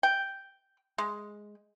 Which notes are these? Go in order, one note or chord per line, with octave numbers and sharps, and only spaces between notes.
G5
G#3